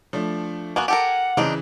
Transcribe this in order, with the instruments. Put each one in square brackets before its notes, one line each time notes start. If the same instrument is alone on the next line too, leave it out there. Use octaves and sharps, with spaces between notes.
[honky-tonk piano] F3 A3 D4
[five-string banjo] A#3 B3 F#4 [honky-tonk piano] G#5
[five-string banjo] G4 A4 A#4 [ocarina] F#5
[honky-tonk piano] C#3 E3 [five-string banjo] C4 D4 D#4